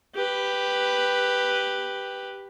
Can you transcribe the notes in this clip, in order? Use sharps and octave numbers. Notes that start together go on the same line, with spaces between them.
G4 B4